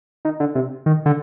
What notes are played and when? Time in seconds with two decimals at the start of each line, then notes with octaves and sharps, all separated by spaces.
0.25 D#3
0.40 D3
0.55 C3
0.86 D#3
1.06 D3